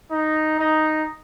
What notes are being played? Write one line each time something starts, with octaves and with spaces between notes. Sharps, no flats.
D#4
D#4